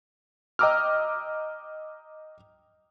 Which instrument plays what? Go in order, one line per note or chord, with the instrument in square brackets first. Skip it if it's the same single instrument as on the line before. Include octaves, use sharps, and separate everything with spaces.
[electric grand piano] D#5 G5 A#5 D6 E6 F6